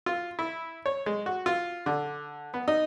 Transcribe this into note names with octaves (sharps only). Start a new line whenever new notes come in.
F4
E4
C#5
G#3
F#4
F4
D3
B3
D#4